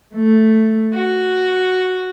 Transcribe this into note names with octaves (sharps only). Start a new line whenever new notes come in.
A3
F#4